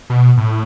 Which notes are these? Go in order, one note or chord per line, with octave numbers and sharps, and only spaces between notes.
B2
A2